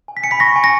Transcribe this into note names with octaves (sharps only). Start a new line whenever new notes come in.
G#5
B6
G#5 C#7
B5 B6
C#6 A#6
G#5
A#6